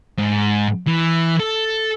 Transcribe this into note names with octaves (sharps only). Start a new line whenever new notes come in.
G#2
E3
A4